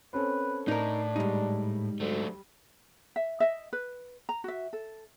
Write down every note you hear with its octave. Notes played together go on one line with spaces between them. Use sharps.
C4 C#4 A4 B4
A2 D4 D#4 A#4
G#2 G3 D#4
D2 F#3 A3
E5
D#5 E5
B4
A#5
F#4 E5
A4